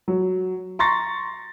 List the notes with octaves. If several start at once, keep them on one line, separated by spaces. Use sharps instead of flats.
F#3
A#5 C6 C#6 A6 A#6